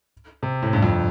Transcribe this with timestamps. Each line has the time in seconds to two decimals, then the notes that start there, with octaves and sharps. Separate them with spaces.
0.43 C3
0.63 A2
0.73 G2
0.83 F2